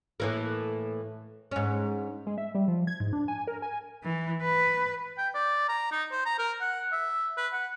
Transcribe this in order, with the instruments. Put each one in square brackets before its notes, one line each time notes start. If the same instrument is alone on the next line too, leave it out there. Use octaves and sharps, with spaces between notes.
[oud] A2 E3 A#3
G#2 C#4
[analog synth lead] G#3
E5
G3
F3
G#6
G#2
D4
G#5
A#4
G#5
[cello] E3
B4
[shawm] G5
D5
A#5
D#4
C5
A#5
A#4
F#5
E5
B4
F#5